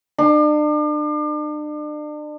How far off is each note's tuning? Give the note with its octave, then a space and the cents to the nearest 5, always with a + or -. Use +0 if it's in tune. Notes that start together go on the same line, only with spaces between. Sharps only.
D4 +40